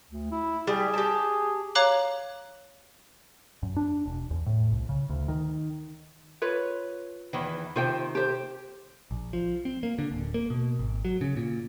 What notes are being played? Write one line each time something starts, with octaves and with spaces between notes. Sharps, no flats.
D2
E4
G3 G#4
G4 A5
C#5 F5 A#5 D6 F#6 F#7
F#2
D4
E1
E2
A2
C2
C#3
D2
D#3
F4 B4 C#5
E2 D#3 E3
C3 D#3 F4 C5 G5
G4 C5
A#1
F3
C4
A#3
D3
D1
A#3
B2
G#1
F#3
C#3
A#2